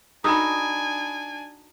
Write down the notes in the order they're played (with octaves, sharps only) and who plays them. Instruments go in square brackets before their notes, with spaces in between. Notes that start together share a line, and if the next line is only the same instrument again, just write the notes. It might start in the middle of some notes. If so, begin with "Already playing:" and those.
[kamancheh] D4 G#5 [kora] D#4 F#4 A4 [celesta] B5 D#6